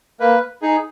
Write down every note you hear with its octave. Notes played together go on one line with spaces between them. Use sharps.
A#3 B4
D#4 G#4